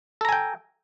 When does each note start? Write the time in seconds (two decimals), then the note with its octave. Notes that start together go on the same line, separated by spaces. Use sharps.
0.21 A4
0.25 A#5
0.29 G#5
0.32 G5